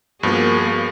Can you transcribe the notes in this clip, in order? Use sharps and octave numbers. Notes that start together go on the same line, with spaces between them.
G2 F3 A#3 B3 F#4 G#4